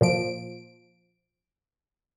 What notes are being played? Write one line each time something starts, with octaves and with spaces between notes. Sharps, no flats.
A#2 F3 D7